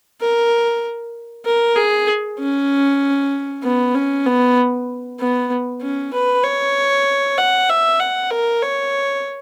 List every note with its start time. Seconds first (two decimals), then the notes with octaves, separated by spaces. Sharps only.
0.21 A#4
1.45 A#4
1.76 G#4
2.39 C#4
3.64 B3
3.95 C#4
4.26 B3
5.20 B3
5.82 C#4
6.13 B4
6.44 C#5
7.38 F#5
7.70 E5
8.00 F#5
8.31 A#4
8.62 C#5